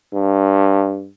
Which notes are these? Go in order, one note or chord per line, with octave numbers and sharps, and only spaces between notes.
G2